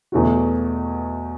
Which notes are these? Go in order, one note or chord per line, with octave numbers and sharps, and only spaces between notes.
E2 B2 A3 F#4